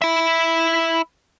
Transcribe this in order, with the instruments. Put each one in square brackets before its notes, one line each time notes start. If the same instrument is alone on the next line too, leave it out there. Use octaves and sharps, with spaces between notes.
[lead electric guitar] E4 E5